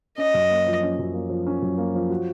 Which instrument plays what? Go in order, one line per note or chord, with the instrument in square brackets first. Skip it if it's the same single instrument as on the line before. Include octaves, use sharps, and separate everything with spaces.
[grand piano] C#4 [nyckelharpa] D#5
[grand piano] F#2
A#3
F3
C#4
F#2
A#3
F3
C#4
F#2
A#3
F3
F#4